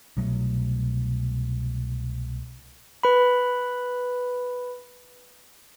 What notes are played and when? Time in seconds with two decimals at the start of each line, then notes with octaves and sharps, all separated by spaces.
0.17 C2 B2 F#3 A3
3.03 B4 B5